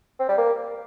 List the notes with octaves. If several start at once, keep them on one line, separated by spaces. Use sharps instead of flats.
C4
G3
A#3